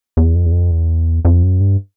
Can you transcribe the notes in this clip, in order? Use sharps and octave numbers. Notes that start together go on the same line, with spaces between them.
E2
F2
E2
F2
E2
F2
F#2
G2